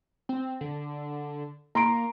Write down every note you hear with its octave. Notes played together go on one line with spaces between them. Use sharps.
C4
D3
A#3 A#5 C6 D7